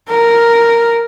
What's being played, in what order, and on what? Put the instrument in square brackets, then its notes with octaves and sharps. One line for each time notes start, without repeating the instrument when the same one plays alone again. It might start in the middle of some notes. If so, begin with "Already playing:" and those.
[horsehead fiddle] A#4